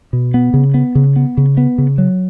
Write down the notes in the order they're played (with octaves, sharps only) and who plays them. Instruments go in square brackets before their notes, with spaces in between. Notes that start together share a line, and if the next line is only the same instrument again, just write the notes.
[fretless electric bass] B2
B3
C#3
B3
C#3
B3
C#3
B3
C#3
F#3